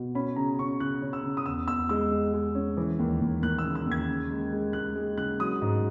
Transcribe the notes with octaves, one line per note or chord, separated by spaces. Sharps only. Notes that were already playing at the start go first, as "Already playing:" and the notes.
Already playing: B2
C#4 B5
C#3 A#5
C#4 C#6
C#3 F#6
C#4
E6
C#3
D#6
E2 E6
E2 E6
G#3 E6
G#3
G#3
C#4
E3
D#2
D#2
D#2 F#6
E6
C#3
E6
D#2 G#6
C#3
G#3
G#3
G#3 F#6
G#3
C#3 F#6
F#3 D#6
G#2